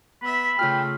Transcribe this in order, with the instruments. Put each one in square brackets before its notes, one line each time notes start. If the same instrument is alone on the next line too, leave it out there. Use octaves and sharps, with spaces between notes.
[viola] B3 E5 [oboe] B5
[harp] C#3 F4 F6 [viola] A3 [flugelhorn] G5